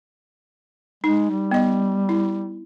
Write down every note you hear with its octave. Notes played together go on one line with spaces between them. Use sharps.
G#3 D#4
G3
B3 D#5
E4